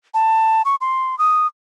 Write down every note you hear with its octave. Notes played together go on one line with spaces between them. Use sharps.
A5
C#6
C6
D#6